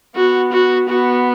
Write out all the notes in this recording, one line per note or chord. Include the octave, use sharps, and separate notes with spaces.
B3 F#4
F#4
B3 F#4